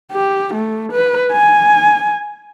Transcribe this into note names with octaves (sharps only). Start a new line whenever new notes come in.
G4
A3
B4
G#5